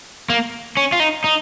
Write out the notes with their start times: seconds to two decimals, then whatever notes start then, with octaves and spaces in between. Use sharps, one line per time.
0.30 A#3
0.77 C#4
0.92 F4
1.00 D#4
1.24 D#4